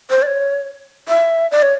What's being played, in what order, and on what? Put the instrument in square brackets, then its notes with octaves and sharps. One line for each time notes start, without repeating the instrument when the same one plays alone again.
[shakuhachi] C5
D5
C#5
E5
D5
C#5